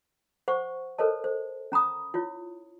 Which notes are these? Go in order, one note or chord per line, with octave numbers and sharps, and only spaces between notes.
C5 F#5 C#6
A4 A#4 C5 C#5 D#5 A5
C5
C#4 A#5 B5 D#6
E4 F4 C#5